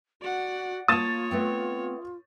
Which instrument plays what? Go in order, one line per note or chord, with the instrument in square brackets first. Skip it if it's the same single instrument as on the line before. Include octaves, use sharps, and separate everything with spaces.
[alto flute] F#4 [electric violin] D5 F#5
[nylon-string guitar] A#3 A5 [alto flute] F4 [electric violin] C#5 [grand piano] D#6 A6 E7
[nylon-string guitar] A3 B3 C4